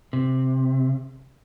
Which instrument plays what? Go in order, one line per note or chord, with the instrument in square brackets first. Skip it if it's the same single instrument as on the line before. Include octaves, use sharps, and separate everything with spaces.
[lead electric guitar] C3